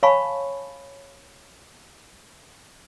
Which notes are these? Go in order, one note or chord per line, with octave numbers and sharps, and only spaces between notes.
C#5 F5 G#5 A5 B5 C#6